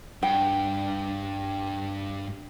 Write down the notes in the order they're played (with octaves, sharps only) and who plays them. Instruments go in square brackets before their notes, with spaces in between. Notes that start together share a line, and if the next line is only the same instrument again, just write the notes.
[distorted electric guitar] G2 [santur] G5